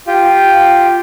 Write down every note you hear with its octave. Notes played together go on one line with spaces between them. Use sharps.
F4 G4